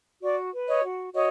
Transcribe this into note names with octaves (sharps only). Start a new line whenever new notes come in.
F#4 D5
B4
C#5 D#5
F#4
F#4 C#5 D#5